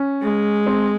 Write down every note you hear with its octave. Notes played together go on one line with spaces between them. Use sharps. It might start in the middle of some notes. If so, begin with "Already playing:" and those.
Already playing: C#4
G#3
C4